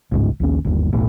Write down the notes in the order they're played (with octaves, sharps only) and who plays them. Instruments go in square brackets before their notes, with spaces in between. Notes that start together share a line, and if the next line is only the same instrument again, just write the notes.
[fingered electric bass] G1 C#2 G#2
A#1 D#2 C#4
G1 D#2
E1 B1 A2